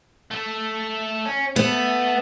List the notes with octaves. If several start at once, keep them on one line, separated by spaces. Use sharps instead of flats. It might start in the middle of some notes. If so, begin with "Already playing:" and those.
A3
C#4
A3 B3